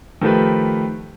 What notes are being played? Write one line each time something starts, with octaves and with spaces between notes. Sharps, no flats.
D#3 F3 A3 G4 B4